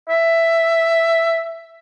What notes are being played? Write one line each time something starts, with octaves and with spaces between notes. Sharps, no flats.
E5